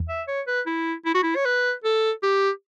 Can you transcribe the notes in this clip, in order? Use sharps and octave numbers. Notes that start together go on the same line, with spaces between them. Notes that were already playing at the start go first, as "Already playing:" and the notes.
Already playing: E2
E5
C#5
B4
E4
E4
F#4
E4
C#5
B4
A4
G4